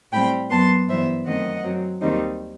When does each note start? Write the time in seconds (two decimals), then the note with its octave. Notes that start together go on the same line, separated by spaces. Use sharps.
0.13 A2 G3 C4 G5 B5
0.50 F#2 F#3 B3 A5 C6
0.89 G2 E3 B3 C5 E5
1.26 F#2 D#3 A3 C4 D#5 F#5
1.64 F#2 F#3 C4
2.01 D#2 D#3 G3 C4 D#4